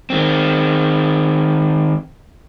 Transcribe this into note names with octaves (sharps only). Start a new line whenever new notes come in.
D#3 C4